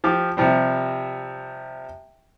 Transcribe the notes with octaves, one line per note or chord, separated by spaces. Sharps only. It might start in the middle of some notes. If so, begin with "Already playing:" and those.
F3 G4 D6
C3 F3 G3 C4